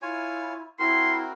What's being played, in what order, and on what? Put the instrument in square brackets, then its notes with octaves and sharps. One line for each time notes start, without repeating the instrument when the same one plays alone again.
[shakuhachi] E4 [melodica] F4 C#5 G#5
[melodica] C4 F#4 A#4 [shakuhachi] E4 [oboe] C6